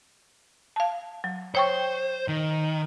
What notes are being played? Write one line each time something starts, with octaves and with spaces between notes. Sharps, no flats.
F5 A5
F#3
C5 C#5 G5 C#6
D#3